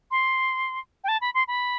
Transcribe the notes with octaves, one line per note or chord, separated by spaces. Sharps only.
C6
G5
A5
B5
C6
B5